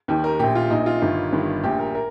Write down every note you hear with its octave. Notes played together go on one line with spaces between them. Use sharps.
D#2 D#3 G4
A#4
A#1 A#2 G4
F4
A#1 A#2 D#4
F4
G1 G2 D#3
G1 G2 D#3
A#1 A#2 G4
A#4
A#4